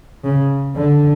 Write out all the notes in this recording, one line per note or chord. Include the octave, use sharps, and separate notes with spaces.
C#3
D3